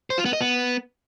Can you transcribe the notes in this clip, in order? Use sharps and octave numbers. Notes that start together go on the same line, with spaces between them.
C5
F4
B3
D#5
B3